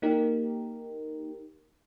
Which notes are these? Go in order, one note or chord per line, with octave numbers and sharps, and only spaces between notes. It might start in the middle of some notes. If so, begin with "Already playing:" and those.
A#3 D#4 G4 A#4